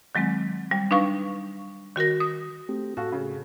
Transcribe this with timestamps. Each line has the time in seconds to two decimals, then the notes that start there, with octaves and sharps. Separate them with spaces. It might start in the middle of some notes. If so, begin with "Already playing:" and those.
0.15 D#3 F#3 G#3 C4
0.71 G3
0.91 D4 D#4 B4 F5 C#6
1.96 D#3 F#4 A#4 A#6
2.20 D#6
2.69 A3 C4 G4
2.97 A2 F#4 A4 F5
3.12 C#3